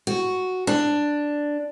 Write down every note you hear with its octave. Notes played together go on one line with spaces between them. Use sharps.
F#4
D4